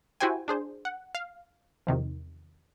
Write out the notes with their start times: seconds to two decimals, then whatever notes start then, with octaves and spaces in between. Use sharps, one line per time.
0.20 E4 F#4 G4 C5 G5 G#5
0.48 D4 G#4 C5
0.85 F#5
1.15 F5
1.87 E2 C3 D#3 F3